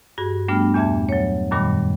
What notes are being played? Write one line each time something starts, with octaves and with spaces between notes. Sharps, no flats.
G2 F#4 G#4
G3 A3 B3 D4 G5 F6
E2 A#2 E5 A5 G#6
F#3 C#5
F#2 A#2 D#3 G3 B5 D6